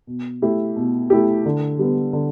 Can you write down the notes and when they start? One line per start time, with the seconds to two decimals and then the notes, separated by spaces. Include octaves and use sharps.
0.07 B2
0.42 A3 E4 G4
0.76 B2
1.10 A3 E4 G4
1.46 D3
1.79 G3 B3
2.13 D3